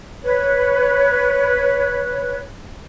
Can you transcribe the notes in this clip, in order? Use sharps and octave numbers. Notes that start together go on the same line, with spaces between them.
B4 C#5